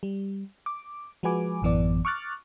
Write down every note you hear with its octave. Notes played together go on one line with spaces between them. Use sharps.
G3
D6
F3 G#3 F#4 B4 G#5 D6
A1 F#2 E3 B3 D5
C#6 D6 F6 F#6 A6